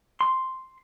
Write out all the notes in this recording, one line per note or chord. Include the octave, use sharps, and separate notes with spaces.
C6